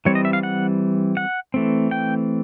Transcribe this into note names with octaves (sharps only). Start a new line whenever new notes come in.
E3 G3 C4 C#5
D#5
E5
F5
F#5
F#5
E3 A3 C4
G5